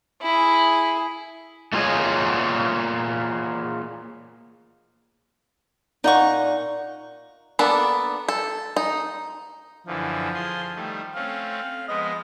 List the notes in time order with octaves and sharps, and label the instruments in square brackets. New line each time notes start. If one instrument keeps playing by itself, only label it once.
[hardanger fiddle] E4 G#4
[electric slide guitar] A3 A#3 F4 G#4 C#5 D#5
[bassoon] A#2 [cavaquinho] D#4 F#5 C#6
[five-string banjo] A#3 B3 D4 A4
A4
D#4
[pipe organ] F#2 D3 E3 [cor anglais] F3
[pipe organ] F4 G#4 C6
D#3 G3 A3
[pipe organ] A3 C4 C#4 [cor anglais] F5
[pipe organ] F3 G#3 B3 [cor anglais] D#5